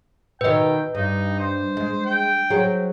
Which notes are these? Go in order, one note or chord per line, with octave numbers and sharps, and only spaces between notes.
B2 D#3 B4 D#5 G5
G2 D#4
C5
G#3
G5
F#3 G#4 C5